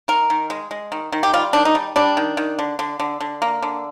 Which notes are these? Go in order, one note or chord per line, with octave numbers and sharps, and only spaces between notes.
D#3 A#4
D#3
G#3
G#3
D#3
D#3
G4
G3 F4
D#3 D4
D#4
G3
G3 D4
D#3
D#3
D3
D3
D3
D3
A#3
D3